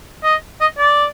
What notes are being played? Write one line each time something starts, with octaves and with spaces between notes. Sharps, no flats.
D#5
D#5
D5